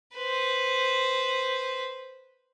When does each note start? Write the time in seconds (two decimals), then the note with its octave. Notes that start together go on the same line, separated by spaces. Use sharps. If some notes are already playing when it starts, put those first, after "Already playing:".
0.15 B4 C5